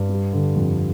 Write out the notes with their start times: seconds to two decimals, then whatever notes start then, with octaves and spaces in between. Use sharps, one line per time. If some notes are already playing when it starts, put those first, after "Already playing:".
Already playing: G2
0.09 G3
0.33 D3
0.56 F2